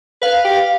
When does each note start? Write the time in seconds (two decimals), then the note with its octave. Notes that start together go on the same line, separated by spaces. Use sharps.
0.22 B4 F5
0.45 G4